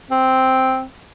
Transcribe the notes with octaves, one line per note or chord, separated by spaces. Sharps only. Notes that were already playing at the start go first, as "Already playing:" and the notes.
C4